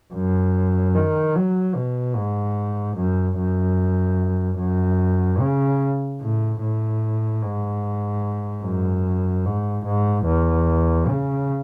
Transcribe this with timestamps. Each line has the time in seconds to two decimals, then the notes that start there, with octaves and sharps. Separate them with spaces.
0.14 F#2
0.95 D#3
1.36 F#3
1.76 B2
2.16 G#2
2.97 F#2
3.38 F#2
4.60 F#2
5.40 C#3
6.21 A2
6.62 A2
7.43 G#2
8.64 F#2
9.45 G#2
9.85 G#2
10.25 E2
11.07 C#3